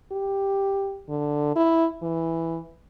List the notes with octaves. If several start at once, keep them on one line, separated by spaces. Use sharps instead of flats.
G4
D3
E4
E3